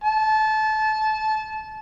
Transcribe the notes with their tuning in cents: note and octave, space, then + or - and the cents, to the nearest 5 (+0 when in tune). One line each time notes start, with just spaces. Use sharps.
A5 -25